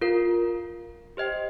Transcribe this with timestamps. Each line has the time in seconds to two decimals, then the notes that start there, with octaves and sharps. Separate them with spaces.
0.01 F4 A#4 F5
1.17 G4 C5 D#5 G5